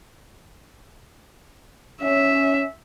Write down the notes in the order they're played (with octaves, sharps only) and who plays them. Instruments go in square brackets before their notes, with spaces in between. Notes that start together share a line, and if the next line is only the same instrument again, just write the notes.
[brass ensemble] C#4 [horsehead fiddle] E5